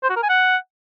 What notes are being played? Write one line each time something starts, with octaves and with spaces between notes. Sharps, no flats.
C5
F#4
A#4
G#5
F#5